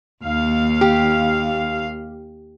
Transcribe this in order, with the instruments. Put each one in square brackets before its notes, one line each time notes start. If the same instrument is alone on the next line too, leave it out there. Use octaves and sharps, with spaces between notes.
[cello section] D#2 F5
[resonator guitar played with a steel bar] G4